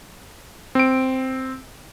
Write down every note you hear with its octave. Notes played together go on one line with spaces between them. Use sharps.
C4 D7